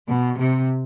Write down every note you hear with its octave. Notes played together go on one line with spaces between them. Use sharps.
B2
C3